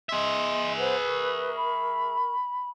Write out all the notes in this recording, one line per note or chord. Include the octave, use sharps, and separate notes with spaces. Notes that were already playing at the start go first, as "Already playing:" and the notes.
G#4 D#5 E5 C6
B4 C5 F#5
A#4 C#6
B5